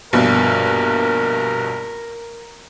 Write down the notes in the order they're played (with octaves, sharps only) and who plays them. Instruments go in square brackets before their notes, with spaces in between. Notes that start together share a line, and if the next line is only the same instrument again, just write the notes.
[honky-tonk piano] A#1 G2 B2 [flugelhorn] A#4